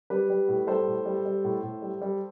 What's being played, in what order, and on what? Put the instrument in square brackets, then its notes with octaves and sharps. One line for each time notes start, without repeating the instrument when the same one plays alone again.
[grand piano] G3 G4 B4
G3
A2
G3 A4 C5
A2
G3
G3
A2
A2
G3
G3